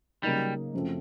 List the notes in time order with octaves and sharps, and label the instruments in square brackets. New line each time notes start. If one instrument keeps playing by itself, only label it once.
[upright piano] C#3 F#3 A#3 D#4 [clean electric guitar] G3
[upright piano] F#2 C#3 F3 A3 C4